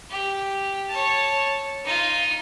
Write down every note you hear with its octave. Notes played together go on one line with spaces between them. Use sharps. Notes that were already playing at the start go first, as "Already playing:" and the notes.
G4
C#5 A5
D#4 F4